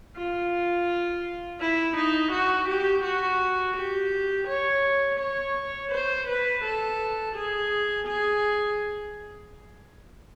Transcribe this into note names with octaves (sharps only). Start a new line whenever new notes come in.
F4
E4
D#4
F#4
G4
F#4
G4
C#5
C#5
C5
B4
A4
G#4
G#4